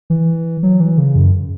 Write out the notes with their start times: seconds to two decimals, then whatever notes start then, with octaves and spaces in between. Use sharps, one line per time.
0.10 E3
0.63 F#3
0.80 E3
0.98 C#3
1.15 F#2